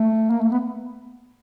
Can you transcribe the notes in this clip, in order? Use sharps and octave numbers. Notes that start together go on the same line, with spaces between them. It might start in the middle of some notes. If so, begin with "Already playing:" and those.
Already playing: A3
A#3
A3
B3